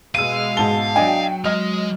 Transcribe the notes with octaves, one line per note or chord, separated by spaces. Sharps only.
B2 G#3 F5 E6 D#7
G#2 A5 G7
F#3 D4 D#5 G5 G#5
G#3 D#5 F6 F7